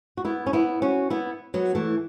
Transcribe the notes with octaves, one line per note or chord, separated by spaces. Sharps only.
F#4
B3 E4
C#4
B3 E4
C#4 F#4
B3 E4
F#3 B3
E3 A3